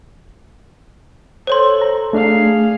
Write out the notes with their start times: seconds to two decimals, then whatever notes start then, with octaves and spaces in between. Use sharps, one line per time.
1.47 A4 C5 C#5 C6
1.81 A#5
2.13 A3 D4 G#4 F5